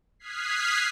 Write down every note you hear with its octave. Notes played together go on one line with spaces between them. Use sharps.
D#6 F6 F#6 G#6 B6 C7